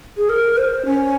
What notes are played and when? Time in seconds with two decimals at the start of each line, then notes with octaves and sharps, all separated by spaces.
0.17 G#4
0.29 A#4
0.58 C5
0.86 C#4